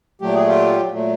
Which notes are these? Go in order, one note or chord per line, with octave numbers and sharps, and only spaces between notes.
A#2 F#3 A3 G4
G#4
F4 G4
A#2 F#3 A3